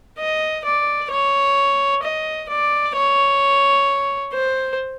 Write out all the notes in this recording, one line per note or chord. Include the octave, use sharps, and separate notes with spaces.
D#5
D5
C#5
D#5
D5
C#5
C5